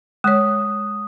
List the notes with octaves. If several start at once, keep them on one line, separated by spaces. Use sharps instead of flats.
G#3 C#5 D#6